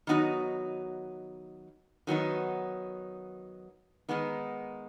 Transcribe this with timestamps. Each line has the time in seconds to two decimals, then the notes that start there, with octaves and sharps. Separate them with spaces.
0.07 D#3 F#3 B3 D#4 F#4
2.07 D#3 F#3 B3 D#4
4.09 D#3 G#3 B3 D#4